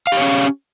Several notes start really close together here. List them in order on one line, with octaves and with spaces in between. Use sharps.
F5 G4 C#5 C#4